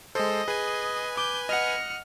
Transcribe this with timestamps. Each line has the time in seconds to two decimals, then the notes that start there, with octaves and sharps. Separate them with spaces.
0.15 G#3 A4 C5 D#5
0.48 G#4 B4 G#5
1.17 D6 G6
1.49 D#5 F#5 F6 C#7